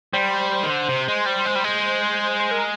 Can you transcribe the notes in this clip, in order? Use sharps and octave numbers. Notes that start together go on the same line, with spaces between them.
G3 C5
D#3
D3
C3
G#3
G3
G#3
G3
G#3
C5
A#4